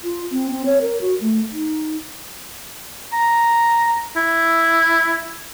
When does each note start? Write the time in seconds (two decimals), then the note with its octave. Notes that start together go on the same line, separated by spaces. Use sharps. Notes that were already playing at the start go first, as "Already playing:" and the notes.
0.04 F4
0.32 C4
0.51 C4
0.66 C#5
0.81 A#4
1.01 F#4
1.21 A3
1.52 D#4
3.13 A#5
4.16 E4